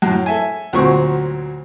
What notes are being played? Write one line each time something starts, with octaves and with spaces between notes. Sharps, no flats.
F#2 A2
A4 E5 G#5
D2 A#2 F#3 C4 C#6